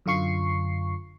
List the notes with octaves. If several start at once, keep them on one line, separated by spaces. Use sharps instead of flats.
F#2 D3 F4 C#6 C7